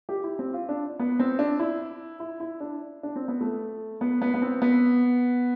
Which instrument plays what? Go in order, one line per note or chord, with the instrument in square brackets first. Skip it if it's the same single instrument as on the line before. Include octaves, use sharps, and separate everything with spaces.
[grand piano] G4
E4
C4
F4
D4
B3
C4
D4
E4
E4
E4
D4
D4
C4
B3
A3
B3
B3
B3
C4
B3